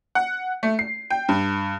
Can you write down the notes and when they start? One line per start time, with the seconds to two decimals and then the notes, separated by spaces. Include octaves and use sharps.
0.15 F#5
0.63 A3
0.79 C7
1.10 G5
1.29 G2